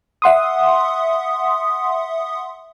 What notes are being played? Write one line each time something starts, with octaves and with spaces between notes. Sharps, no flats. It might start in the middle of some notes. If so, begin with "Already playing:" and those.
E5 F#5 C6 D#6